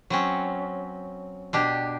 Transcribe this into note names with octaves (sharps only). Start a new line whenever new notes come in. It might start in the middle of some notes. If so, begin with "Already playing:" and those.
F#3 C4 C#4
B2 D4 G4